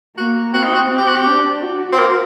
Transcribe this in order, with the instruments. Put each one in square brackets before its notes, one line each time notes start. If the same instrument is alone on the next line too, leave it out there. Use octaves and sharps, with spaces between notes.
[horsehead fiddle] A#3 [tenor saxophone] F#4
[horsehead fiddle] C4 [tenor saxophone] F#4
[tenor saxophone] D#4
F#4
[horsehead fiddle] C4
[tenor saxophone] G4
F#4
G4
[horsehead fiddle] D4
F#4
[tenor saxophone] C4
A#3